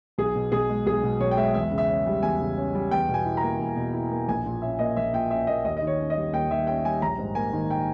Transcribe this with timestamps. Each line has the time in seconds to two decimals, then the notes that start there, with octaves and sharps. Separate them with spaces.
0.18 B1 G#4
0.36 B2
0.52 B1 G#4
0.69 G#3
0.86 B1 G#4
1.04 B2
1.20 B1 C#5
1.31 G5
1.37 G#3 E5
1.54 E2 E5
1.71 C#3
1.78 E5
1.89 C#4
2.07 G3
2.23 E2 G#5
2.40 C#3
2.57 C#4
2.75 G3
2.91 E2 G5
3.09 B2 G#5
3.25 E4
3.37 A#5
3.43 A#3
3.59 E2
3.76 B2
3.93 E4
4.11 A#3
4.28 A#1 G#5
4.46 A#2
4.62 C#4 E5
4.79 A#3 D#5
4.96 A#1 E5
5.13 A#2 G5
5.31 C#4 E5
5.47 A#3 D#5
5.64 D#2 D#5
5.77 D#5
5.82 D#3 C#5
5.99 C#4
6.10 D#5
6.16 G3
6.33 D#2 G5
6.50 D#3 E5
6.67 C#4 G5
6.85 G3 G#5
7.02 A#1 A#5
7.18 G#2
7.35 A#3 G#5
7.53 D#3
7.71 G5